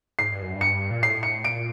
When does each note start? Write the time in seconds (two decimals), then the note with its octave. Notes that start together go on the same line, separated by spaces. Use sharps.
0.19 G#2 C7
0.32 G2
0.42 F#2
0.55 G2
0.61 C#7
0.91 A#2
1.02 A2 C7
1.23 C#7
1.44 A#2 D7